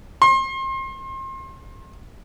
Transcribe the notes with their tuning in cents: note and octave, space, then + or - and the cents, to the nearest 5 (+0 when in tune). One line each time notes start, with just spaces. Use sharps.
C6 +35